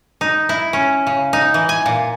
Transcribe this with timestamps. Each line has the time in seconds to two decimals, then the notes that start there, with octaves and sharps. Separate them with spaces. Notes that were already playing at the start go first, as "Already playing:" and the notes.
0.21 D#4
0.49 E4
0.73 C#4
1.07 C#3
1.33 D#4
1.54 E3
1.69 G#5
1.86 A#2